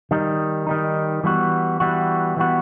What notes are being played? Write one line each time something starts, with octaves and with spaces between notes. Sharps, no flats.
D#3 G3 D#4
D#3 G3 D#4
E3 G3 B3 F#4
E3 G3 B3 F#4
E3 G3 B3 F#4